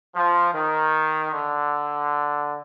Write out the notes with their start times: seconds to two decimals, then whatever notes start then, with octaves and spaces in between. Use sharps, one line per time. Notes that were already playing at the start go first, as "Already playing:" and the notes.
0.16 F3
0.54 D#3
1.32 D3